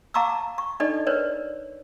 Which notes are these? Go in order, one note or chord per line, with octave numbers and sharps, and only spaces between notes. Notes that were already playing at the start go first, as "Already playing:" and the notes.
F5 A5 A#5 C#6 D6 E6
C#6
D4 D#4 A4 D5 D#5
A#4 B4 C#5 D5